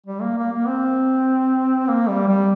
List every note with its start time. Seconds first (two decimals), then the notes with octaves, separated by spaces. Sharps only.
0.06 G3
0.22 A#3
0.37 A#3
0.52 A#3
0.67 C4
1.88 A#3
2.09 G3
2.28 G3